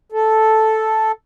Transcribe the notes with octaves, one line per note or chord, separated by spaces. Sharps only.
A4